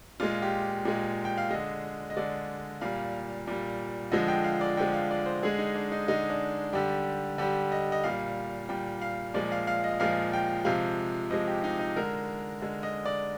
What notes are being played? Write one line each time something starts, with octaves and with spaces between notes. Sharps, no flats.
A#2 G#3 F4
G4
A#2 G#3
G5
F5
D3 G#3 D#5
D#5
D3 G#3 D5
A#2 G3 F5
A#2 G3
D3 F3 G#3 D#5
G5
F5
D5
D3 F3 G#3 G5
F5
D5
C5
D3 G#3 G#4
D#4
D4
D#4
D3 G#3 D#4
D4
D3 G3 G4
D3 G3 G4
D#5
D#5
A#2 G3 F5
A#2 G3 G5
F5
A#2 F3 G#3 D5
F5
F5
D#5
A#2 F3 G#3 F5
G5
C3 F3 G#3 F5
C3 F3 G#3 D#5
G4
D#4
D#4
D3 G#3 A#4
D3 G#3
D#5
D5